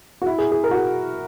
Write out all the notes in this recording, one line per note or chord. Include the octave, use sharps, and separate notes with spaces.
F#4
E4
G#4
G#4
A#4
F#4
G#4